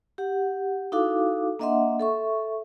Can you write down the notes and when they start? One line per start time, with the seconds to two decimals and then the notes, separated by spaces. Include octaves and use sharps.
0.18 G4 F#5
0.92 D#4 E4 F#4 A4 F5 D6
1.59 A#3 D4 D#5 E5 F#5 C6
2.00 A4 E5 C#6